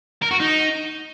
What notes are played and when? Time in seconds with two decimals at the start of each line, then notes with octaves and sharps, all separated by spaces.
0.22 A#4
0.31 F#4
0.40 D#4